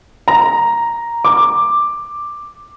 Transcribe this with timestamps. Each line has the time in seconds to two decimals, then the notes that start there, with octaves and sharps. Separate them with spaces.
0.28 A#5
1.25 D6